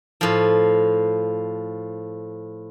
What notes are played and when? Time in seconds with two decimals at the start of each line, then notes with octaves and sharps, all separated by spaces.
0.21 A2 F3